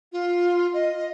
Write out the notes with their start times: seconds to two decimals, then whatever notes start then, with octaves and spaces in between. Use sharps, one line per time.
0.12 F4
0.73 D#5